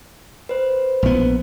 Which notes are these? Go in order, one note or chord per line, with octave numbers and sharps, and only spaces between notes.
B4 C5
A#1 B3